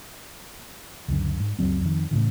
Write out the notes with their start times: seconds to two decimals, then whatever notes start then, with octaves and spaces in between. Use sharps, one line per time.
1.08 C#2 F#2 D3
1.40 G#2
1.59 F#1 C#2 F#3 C4
1.81 F2 D#3
2.11 A2 C#3 E3